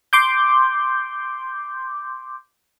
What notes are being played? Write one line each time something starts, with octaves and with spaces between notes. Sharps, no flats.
C6 D6 G6